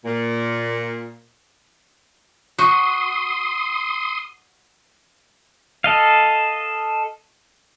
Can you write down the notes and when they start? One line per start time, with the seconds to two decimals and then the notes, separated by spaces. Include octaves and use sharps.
0.05 A#2
2.59 F#4 C6 D#6
5.84 A4 D#5 F5